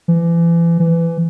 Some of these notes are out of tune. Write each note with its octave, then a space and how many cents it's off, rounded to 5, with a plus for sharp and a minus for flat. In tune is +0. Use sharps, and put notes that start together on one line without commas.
E3 +35
E3 +20